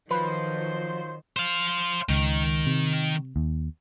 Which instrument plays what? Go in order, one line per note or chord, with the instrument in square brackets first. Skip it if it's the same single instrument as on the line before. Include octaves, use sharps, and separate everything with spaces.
[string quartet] D#3 [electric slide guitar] F3 [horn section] F#3 F4 C5 [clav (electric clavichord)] B4
[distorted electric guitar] C5 F5
[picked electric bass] C#2 [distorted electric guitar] D#3
[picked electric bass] C3
D#2